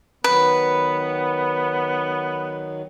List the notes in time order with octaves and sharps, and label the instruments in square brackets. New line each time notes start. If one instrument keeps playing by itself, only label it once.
[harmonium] D#3 F#3 [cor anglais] B3 [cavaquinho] B4